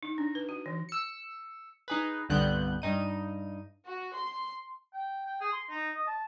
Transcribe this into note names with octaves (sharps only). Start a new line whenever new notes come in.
D#4
D4
B4
F#4
E3
E6 C#7
D#4 G#4 B4
C2 G2 D3 B3 F#6 G6
G2 D#4 D#7
F#4
C6
G5
G5
G#4
C6
D#4
D#5
A5